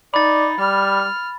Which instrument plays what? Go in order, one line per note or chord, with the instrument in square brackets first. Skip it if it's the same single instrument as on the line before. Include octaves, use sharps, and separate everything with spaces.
[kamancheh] D#4 [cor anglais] D5 [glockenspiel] B5 A6
[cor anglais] G3 [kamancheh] F6